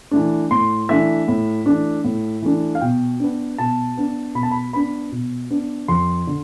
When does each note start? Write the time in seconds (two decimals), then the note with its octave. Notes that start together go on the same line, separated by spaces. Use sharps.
0.11 E3 A3 D4
0.51 A2 C6
0.89 E3 A3 D4 E5
1.28 A2
1.66 E3 A3 D4
2.04 A2
2.42 E3 A3 D4
2.75 F5
2.81 B2 G5
3.20 B3 D4
3.58 B2 A5
3.97 B3 D4
4.35 B2 B5
4.43 A5
4.51 B5
4.73 B3 D4 B5
5.12 B2
5.50 B3 D4
5.88 F2 C6
6.27 D3